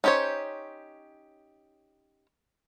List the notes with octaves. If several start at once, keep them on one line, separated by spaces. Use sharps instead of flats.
C#4 D#4 G4 C5 C#5